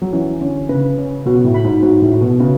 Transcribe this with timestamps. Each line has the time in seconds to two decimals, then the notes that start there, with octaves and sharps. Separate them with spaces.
0.02 F#3
0.13 E3 C#4
0.40 D3 C#4
0.69 C#3 B4
0.98 C#4
1.26 B2 F#4
1.44 A2
1.54 B5
1.65 G#2
1.83 G#2 F#4
2.02 A2
2.12 F#4
2.21 B2
2.40 C#3 B4